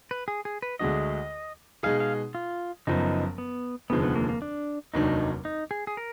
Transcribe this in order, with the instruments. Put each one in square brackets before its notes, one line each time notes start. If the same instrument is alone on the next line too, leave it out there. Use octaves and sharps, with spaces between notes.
[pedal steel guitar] B4
G#4
G#4
B4
[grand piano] D2 D3 G#3 D4 F#4 [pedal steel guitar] D#5
[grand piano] B2 G#3 D#4 G#4 [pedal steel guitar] F5
[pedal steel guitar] F5
F4
[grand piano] F#1 F#2 F3 B3 [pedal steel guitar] D#4
[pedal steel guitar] B3
[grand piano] F1 D#2 D3 F3 G#3 [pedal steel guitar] B3
[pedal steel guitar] B3
A#3
A#3
D4
[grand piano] F1 D#2 D#3 F#3 D4 [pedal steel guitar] D#4
[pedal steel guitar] D#4
G#4
G#4
A#4